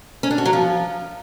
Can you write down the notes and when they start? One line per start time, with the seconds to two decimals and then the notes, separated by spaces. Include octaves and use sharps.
0.23 C#4
0.31 D4
0.38 F#4
0.45 F#3
0.53 F3